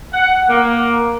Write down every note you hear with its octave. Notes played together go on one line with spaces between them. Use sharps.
F#5
A#3